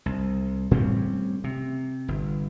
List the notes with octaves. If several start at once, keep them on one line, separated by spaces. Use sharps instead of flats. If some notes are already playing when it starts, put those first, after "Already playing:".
C2
A2 G3 C4 C#4
C3
G1